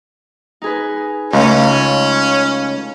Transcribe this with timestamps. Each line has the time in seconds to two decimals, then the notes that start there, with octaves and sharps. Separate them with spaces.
0.62 D#4 G#4 B4
1.33 C#2 A3 C#4 D#4 F5